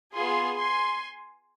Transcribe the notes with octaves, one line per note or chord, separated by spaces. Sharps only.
B3 F4 G#4 G#5 C6
G#5 C6